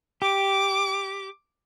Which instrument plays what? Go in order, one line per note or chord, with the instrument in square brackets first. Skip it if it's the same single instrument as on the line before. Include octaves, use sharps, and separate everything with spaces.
[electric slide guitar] G4 [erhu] D6